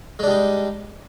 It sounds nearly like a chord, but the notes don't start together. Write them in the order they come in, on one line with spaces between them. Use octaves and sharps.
G#3 D4 G3 D#4